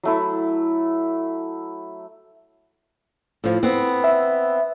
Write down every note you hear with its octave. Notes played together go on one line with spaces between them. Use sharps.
F#3 A3 E4
A2 F3
B3 C4
E5